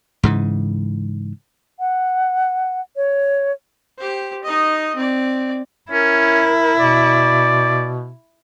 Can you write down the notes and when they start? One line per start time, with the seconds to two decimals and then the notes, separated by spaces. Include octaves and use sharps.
0.23 G#2 C#3 E3
1.80 F#5
2.96 C#5
3.98 G4 C5
4.43 D#4 D#5
4.95 C4 D5
5.92 C#4 E4 A#4
6.80 B2 D5